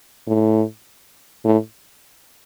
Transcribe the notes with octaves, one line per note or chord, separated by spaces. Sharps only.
A2
A2